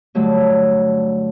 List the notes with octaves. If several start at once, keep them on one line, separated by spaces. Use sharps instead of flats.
G2 D3 F#3 A3